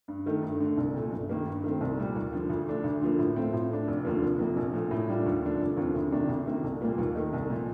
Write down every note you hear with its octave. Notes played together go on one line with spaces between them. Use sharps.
G2
D#3 A3 D#4
G2
D3 A3
C2
A#2 A3
G1
G2 D#3 A#3
G2
D#3 A3 C4
C2
A#2 G3
D#2
D3 F3
D2
D3 A3 D4
D2
D3 F3 A#3
A2
A3 C4 F4
A2
A3 D4
F1
D#2 D3 F3 A#3
F1
F2 C3 F3 A#3
A#1
A#2 F3 A3
A2
G3 D4 F4
D#2
D3 F3 A3 D4
F1
D#2 D3 F3 C4
D2
C3 D#3 A#3 D4
D2
C3 D#3 A#3
C2
A#2 G3 A#3 F4
D#2
D#3 A3 D#4
C2
A#2 F3